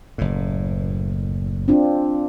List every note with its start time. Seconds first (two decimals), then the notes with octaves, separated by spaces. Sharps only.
0.18 F#1 A2
1.68 C4 D4 F4